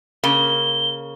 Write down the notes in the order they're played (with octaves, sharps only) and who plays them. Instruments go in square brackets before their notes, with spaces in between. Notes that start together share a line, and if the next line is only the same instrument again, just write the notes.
[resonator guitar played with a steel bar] C#3 A#3 [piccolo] G7